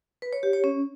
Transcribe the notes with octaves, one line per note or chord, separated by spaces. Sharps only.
B4
C#5
G4
C#5
C#4